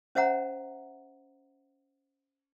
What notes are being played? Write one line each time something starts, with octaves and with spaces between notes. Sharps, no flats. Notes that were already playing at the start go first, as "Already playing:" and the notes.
C#4 C5 E5 F#5 A#5